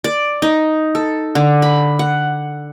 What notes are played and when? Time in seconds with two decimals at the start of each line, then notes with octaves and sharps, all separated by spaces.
0.04 D5
0.42 D#4
0.95 A4
1.35 D3
1.62 B5
1.99 F#5